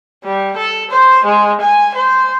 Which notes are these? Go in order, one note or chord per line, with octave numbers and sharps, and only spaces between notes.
G3
A4
C5
G#3
G#5
C5